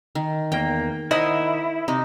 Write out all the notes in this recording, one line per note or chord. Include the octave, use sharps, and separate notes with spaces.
D#3
E2 A#3 G5
D#3 E4 C5 D#5 F#5
C3 D#4